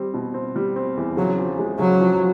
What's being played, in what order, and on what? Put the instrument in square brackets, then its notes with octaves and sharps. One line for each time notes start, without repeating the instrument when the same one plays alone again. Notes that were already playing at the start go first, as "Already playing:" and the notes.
Already playing: [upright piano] G3 C4
B2
C4
G3
C4
E2
[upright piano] C#3 [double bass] F#3
[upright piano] F3
G#3
[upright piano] C#3 [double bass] F#3
[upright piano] F3